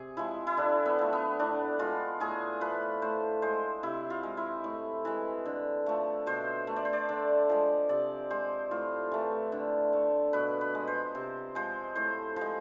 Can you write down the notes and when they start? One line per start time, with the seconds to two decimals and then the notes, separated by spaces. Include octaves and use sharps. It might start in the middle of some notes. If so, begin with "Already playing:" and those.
Already playing: C3 G#4
0.17 F3 G#3 E4
0.47 E4
0.57 D3 D4
0.86 B3
0.99 F3 A3
1.13 B3
1.39 A2 D4
1.79 G#3 F4
2.20 A2 G#4
2.61 F3 A3 B4
3.02 A2 C5
3.42 G#3 C5
3.83 C3 E4
4.10 F4
4.23 G#3
4.37 E4
4.64 A2
5.05 E3 G#3
5.46 D3
5.86 F3 A3
6.26 B2 C5
6.67 A3
6.76 D5
6.85 C5
6.93 D5
7.09 D3
7.49 F3 G#3
7.89 C3 D5
8.31 G#3 C5
8.71 A2 F4
9.12 E3 A3
9.52 D3
9.93 A3
10.33 B2 B4
10.61 B4
10.75 G#3
10.88 C5
11.15 C3
11.55 F3 G#3 C5
11.95 A2 C5
12.36 F3 G#3 C5